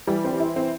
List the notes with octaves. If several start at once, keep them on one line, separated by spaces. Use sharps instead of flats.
E3 G3
C4
E3
E4
E3 C4